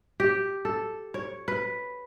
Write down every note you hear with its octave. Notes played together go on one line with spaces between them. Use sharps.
G4
A4
C#5
B4